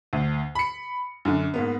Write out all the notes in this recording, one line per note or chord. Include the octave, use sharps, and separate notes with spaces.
D2
B5 C#7
F#2 D3
G#2 A#3 B3